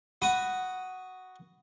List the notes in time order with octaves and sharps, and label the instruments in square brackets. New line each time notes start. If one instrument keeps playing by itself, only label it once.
[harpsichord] F#4 B5 D#6